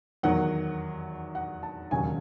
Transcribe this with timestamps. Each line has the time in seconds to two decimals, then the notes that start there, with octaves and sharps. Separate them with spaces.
0.23 E2 D#3 F#3 F#5
1.35 F#5
1.63 A5
1.91 E1 D#2 C#3 F#3 G#5